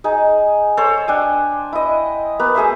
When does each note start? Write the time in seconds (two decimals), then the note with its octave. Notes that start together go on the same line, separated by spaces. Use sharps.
0.04 D#4 G#4
0.77 A4 C5 C#5
1.08 D4 G5 G#5
1.73 E4 D#5
2.39 A#3 B3
2.55 A3 G#4 C5 E5